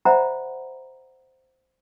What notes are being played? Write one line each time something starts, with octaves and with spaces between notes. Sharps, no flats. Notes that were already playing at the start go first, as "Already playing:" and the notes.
C5 D5 E5 F#5 A#5 B5